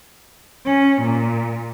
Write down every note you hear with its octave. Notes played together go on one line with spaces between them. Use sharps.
C#4
A#2